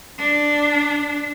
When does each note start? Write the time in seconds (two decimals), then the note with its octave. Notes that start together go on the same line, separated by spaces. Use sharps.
0.19 D4